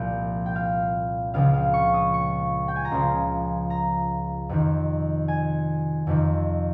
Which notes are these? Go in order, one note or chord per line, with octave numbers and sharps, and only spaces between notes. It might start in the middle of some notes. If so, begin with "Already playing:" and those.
Already playing: C2 A#2 F3 G5
G5
F5
C#2 C#3 F3 F5
F5
C#6
D#6
C#6
G5
G#5
A#5
C#2 C#3 F3 C6
A#5
F2 C3 D#3
G#5
F2 C3 D#3